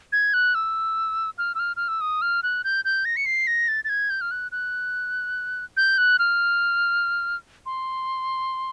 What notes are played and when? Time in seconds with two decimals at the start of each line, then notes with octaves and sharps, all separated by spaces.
0.12 G#6
0.34 F#6
0.55 E6
1.38 F6
1.55 E6
1.59 F6
1.76 F6
1.88 E6
2.01 D#6
2.22 F6
2.43 F#6
2.64 G6
2.85 G6
3.05 A#6
3.17 C#7
3.26 C7
3.47 A#6
3.68 A6
3.84 A6
3.89 G#6
4.10 G6
4.21 F6
4.31 F#6
4.52 F#6
5.77 G6
5.98 F#6
6.19 F6
7.66 C6